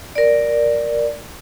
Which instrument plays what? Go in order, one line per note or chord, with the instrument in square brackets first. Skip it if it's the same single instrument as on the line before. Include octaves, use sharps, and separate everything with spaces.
[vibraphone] A#4 D5